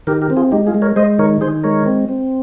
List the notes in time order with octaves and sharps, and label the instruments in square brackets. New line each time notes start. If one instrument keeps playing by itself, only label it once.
[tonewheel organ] D#3 G4 A#4
G4 A#4
C4
F4 G#4
G#3 D#4 G4
F4 G#4
G#3
A#4 C#5
G#3 C5 D#5
D#3 A#4 C#5
D#3 G#4 C5
G#3 A#4 C#5
C4
C4